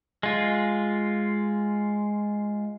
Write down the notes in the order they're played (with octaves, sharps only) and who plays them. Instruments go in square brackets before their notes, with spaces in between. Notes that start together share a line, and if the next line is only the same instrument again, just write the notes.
[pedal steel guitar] G#3 F4